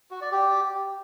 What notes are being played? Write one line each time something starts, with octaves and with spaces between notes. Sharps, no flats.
F#4
D5
G4